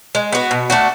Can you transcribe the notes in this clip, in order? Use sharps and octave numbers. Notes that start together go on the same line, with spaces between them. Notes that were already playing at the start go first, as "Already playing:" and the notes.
G#3
B3 F#4
B2
A3 D4 F#4